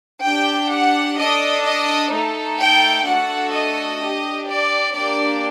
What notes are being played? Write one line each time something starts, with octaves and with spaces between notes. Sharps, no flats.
D4 G4 G5
F#5
D4 A4 D#5
D#5
A3 D#4 A4
G5
A3 D4 F#4 A4 F#5
D#5
D4 G4
D5
A#3 D4 G4 D5